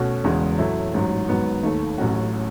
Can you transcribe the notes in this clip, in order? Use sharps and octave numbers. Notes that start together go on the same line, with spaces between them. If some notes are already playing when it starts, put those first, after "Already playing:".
Already playing: B2 A3 C#4 F#4
E1 E2 C#3 E3 G#3
A2 F#3 A3 E4
A1 G#2 F#3
G#2 D#3 F#3 B3
D#2 D#3 A3
A1 A2 F#3 C#4 F#4